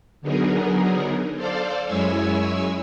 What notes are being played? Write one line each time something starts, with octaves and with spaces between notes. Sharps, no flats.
D3 F#3 B3 D#4 G#4 A#4
A4 C5 D5 F5
F#2 G#3 E4 C#5 G#5 E6